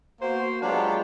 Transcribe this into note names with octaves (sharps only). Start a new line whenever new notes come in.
A#3 B3 F#4 C5
F#3 G#3 B3 D4 F4 G4